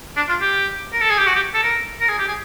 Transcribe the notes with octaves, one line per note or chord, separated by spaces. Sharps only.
D4
F4
G4
A#4
A4
G#4
G4
F#4
G4
A4
A#4
A#4
G#4
G4
G#4